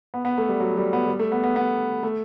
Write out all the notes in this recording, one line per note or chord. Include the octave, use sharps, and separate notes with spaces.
B3
B3
A3
G3
F#3
G3
B3
G3
A3
B3
B3
B3
A3